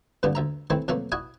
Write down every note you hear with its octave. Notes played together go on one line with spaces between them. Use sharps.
G2 A#2 D3 B3 D4
D2 E5 A#5
D#3 E3 A3 C4 E4
F2 B2 F#3 A3 A#3
E4 F#4 D#5 G#5